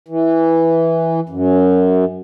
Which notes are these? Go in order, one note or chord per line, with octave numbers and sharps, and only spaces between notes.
E3
F#2